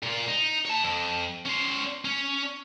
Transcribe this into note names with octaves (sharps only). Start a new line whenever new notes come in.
A#2 F4
D#4
C#5 A5
F2
C#4 C5
C#4